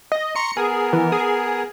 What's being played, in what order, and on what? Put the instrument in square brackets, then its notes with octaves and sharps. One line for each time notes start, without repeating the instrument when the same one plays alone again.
[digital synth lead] D#5
[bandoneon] A#5 C6 C#6 [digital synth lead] C#7
[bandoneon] B3 A#4 [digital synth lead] G#4
[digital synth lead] E3
G#4